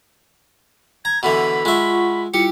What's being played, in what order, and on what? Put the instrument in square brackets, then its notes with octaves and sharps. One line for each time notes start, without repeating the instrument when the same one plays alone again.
[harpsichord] A#5 [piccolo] G#6
[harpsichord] B2 D3 E3 [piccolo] B5
[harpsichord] G#3 E5 [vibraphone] F4 F#5 C#6
[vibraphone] G3 E4 F4 [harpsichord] G4 [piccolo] C#7